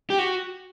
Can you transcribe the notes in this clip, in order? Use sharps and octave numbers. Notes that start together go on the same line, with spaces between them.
G4
F#4